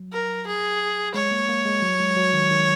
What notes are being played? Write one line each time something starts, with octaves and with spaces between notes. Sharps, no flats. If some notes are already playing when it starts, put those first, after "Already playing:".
Already playing: F#3
A#4
G#4
G#3 C#5
A#3
A#3
G#3
F#3
G#3
F#3
D#3
D#3